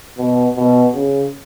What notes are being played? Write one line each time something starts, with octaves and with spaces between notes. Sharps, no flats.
B2
B2
C#3